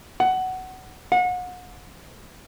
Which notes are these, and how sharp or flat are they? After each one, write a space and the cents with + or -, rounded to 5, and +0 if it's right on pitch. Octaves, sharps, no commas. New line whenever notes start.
F#5 +15
F#5 -35